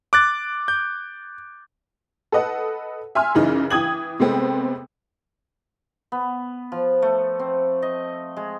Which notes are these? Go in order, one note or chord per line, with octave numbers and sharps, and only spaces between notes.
D6 F#6 A6
G6
A4 B4 D#5 F#5
E5 G#5 C6 F6
F#2 C#3 E3 D#4
E3 G5 D#6 G#6 F#7
C3 G#3 A3 B3 C4
B3
F3
A3
C4
D#5
G#3